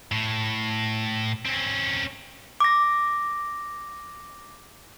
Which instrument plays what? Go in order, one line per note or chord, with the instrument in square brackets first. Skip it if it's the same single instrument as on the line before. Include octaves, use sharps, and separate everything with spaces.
[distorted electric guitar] A2
C4 C#4
[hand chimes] D6 A#6